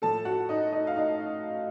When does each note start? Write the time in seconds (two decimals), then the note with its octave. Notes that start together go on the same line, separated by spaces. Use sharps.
0.02 A2 F3 A4 A5
0.25 F#4 F#5
0.49 D#4 D#5
0.72 D#4 D#5
0.87 F5
0.96 D#4 D#5